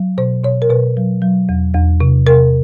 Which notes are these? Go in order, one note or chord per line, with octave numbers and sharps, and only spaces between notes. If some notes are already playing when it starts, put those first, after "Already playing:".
Already playing: F#3
B2 C5
B2 C#5
A#4
B2 B4
F#3
F#3
E2
E2
C3
C3 A#4